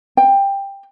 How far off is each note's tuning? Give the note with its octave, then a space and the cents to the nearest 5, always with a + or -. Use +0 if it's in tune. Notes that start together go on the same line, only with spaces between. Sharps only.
G5 +15